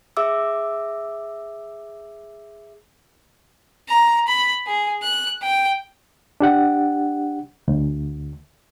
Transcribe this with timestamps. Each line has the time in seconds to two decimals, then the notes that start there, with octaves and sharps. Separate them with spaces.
0.17 G#4 E5 D6 E6
3.89 A#5
4.27 B5
4.67 G#4
5.02 F#6
5.42 G5
6.40 D4 G4 F#5
7.68 D2